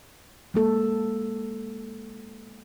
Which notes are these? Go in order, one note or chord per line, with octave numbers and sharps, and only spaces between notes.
G#3 A#3 A4